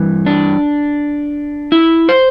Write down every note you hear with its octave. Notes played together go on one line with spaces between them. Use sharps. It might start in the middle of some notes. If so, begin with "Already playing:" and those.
Already playing: G2 E3
D4
E4
C5